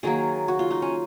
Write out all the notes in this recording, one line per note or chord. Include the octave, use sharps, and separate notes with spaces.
D#3 F#3 A#3 G#4
F#4
F4
D#4
C#4